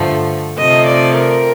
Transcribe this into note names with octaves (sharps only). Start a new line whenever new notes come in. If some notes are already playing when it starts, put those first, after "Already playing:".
Already playing: G2 D3 F3 A3
C3 F3 A3 D#5
D5
A#4